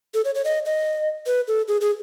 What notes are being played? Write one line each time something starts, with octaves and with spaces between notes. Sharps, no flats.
A4
C#5
C#5
D#5
D#5
B4
A4
G#4
G#4